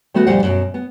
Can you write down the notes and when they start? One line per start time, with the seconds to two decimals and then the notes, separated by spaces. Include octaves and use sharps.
0.14 D#3 A3 B3 F#4 A4 B4
0.27 D2 A#2 F3 G3 C5 F#5
0.43 F#2 B2
0.74 B3